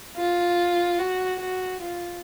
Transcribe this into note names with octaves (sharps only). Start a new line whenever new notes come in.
F4
F#4
F#4
F4